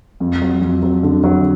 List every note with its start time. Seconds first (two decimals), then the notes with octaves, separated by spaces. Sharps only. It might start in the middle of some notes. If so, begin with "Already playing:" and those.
0.20 F2
0.42 F#3
0.61 F2
0.83 F#3
1.03 D3
1.24 F#3